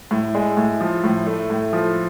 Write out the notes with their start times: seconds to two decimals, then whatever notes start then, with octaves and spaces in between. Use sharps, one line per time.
0.11 A2
0.35 G#3
0.57 A2
0.80 F3
1.04 A2
1.27 A3
1.50 A2
1.73 F3